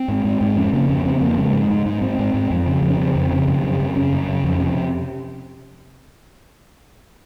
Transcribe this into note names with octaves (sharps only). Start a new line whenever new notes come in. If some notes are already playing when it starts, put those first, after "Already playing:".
Already playing: C4
G#2
G#2
G#2
F2 C#4
C#3 A#3
F2 C#4
C#3 C4
F2 A#3
C#3 G#3
G#2
G#2
G#2
G#2 C4
G#2
G#2
F2
C#3
F2
C#4
C#3 C4
F2
C#3
F#2
C#3
F#2
C#3 C#4
F#2
C#3
F2
C3